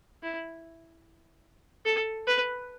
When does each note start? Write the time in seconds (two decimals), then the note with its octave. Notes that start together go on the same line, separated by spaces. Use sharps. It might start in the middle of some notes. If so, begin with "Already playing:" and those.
0.23 E4
1.85 A4
2.27 B4